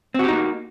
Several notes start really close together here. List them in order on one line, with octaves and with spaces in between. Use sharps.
C4 F#4 G4 D#4 A#3